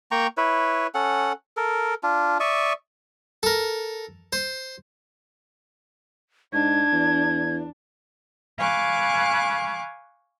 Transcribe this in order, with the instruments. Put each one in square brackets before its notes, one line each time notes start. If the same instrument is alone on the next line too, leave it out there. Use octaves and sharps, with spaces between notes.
[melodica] A#3 G5 A#5 C#6
E4 B4 C#5
C#4 A4 F#5
A4 A#4
D4 F4
D5 E5 C#6 D#6
[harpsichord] A4 A#4
C5
[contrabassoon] G#2 [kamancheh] D4 [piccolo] G#6
[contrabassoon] E2
[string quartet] F5 G#5 B5 C#6 D6 F#6